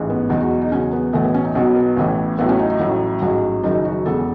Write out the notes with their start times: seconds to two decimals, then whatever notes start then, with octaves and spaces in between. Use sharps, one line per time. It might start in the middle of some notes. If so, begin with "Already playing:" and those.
Already playing: A1 G#2 E3
0.10 B3
0.30 E1 E2 B2 F#3 D#4
0.40 F#4
0.61 D#4
0.72 E2 C#3 F#3 C#4
0.93 B3
1.13 B1 A2 E3 A3
1.24 B3
1.34 C#4
1.45 D#4
1.55 B1 B2 F#3 C#4
1.76 B3
1.97 A1 A2 E3
2.39 A1 A2 F#3 B3
2.49 C#4
2.59 D#4
2.70 D#4
2.80 A1 A2 F#3
3.22 A1 G#2 F#3
3.63 F#1 F#2 D#3 F#3 D#4
3.85 F#4
4.06 E1 E2 C#3 A4